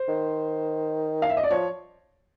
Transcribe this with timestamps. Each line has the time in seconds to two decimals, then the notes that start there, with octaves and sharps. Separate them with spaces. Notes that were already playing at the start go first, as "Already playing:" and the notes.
Already playing: C5
0.08 D#3
1.22 F5
1.30 E5
1.37 D#5
1.43 D5
1.51 F3 C#5